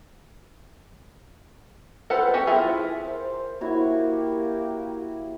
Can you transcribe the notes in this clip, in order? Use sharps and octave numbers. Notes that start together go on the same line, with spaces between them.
F4 A4 B4 C5 F#5
B3 F#4 G4 G#5
E4 F4 G#4 E5
A#4 C5
A#3 E4 F#4 G4 C#5